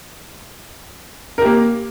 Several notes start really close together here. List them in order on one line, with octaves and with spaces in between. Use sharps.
A#4 G4 A#3